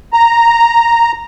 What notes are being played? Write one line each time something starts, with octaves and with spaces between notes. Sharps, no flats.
A#5